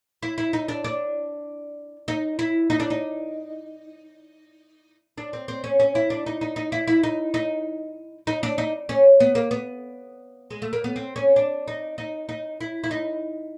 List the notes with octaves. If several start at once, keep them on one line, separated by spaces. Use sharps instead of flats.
E4
E4
D#4
D4
D4
D#4
E4
D#4
D4
D#4
D4
C4
C4
C#4
C#4
E4
D4
D#4
D#4
D#4
E4
E4
D#4
D#4
D#4
D4
D#4
C#4
B3
A#3
B3
G#3
A3
A#3
B3
C4
C#4
D4
D#4
D#4
D#4
E4
E4
D#4